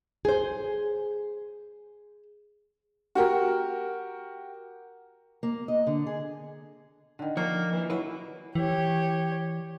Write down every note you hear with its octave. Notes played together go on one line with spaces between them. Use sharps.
G#4 C5
F#4 G4 A#4
A#3
D#5
D3
G#4
D3 D#3
F3 A#3 C#5
E3
F#3 E4 B4 D#5
E3 G4 C#5